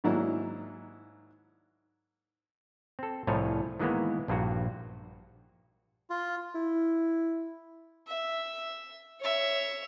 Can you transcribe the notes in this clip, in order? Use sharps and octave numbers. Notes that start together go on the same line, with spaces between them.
G#2 D#3 F#3 A#3 D4 E4
C4 A4
C2 A2 F3 A3 G#4 C#5
D#3 E3 G#3 A#3 B3
A#1 G2 F4 F#4
F4
E4
E5
C#5 E5